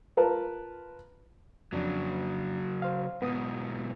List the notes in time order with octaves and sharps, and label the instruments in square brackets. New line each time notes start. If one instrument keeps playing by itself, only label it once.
[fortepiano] F4 A#4 B4 A5
[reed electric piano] F2 D4 [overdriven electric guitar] C#3 F#3
[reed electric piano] C5 F5
[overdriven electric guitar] G#2 B2 [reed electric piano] B3 D#6